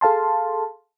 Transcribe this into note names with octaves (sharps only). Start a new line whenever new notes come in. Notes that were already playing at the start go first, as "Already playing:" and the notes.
G#4 A4 F5 A5 C6